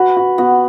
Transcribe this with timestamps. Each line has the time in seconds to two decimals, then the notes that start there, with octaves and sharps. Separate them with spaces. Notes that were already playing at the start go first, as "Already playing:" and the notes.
Already playing: F#4 B4
0.17 F#4
0.38 B3 F#4